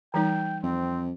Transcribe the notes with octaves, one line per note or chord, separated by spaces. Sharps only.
E3 G3 D#4 G5
F2 C4